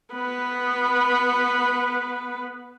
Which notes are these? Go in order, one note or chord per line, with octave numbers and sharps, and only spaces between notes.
B3 B4